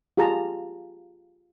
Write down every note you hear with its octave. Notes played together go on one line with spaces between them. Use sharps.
F4 G4 G#4 A5 A#5